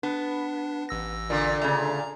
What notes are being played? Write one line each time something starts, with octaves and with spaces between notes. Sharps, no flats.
B3 D4
A1 E6 A#6
A#2 D3
C#3 A3 A#5